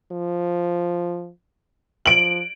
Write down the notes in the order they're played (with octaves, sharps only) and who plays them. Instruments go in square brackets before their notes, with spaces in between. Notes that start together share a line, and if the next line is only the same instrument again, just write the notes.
[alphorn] F3
[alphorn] F3 [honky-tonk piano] D7 F#7